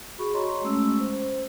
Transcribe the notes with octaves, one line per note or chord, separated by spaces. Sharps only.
F#4 G#4 B5 C#6
C#5 D#5 A#5 C6 C#6
G#3 A3 C#4 E6
C5